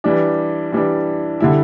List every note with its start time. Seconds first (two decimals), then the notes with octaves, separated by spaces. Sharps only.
0.04 E3 G3 D4
0.72 E3 G3 D4
1.40 D3 G3 E4